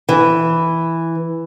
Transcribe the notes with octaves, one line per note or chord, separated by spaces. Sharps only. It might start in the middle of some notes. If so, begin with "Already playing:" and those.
E3